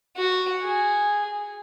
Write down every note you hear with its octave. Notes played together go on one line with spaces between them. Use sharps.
F#4
G#4